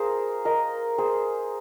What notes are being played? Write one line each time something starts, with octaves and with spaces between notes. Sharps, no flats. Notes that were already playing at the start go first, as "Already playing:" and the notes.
Already playing: G#4 A#4 C5 F5
A#4 D#5
G#4 C5